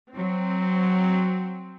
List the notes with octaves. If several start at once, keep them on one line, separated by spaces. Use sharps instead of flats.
F#3 C4